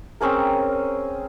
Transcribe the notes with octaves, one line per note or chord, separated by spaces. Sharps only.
C4 C#4 G#4 A#4